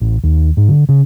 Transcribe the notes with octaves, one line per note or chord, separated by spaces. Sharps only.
A1
D#2
G#2
D3
C#3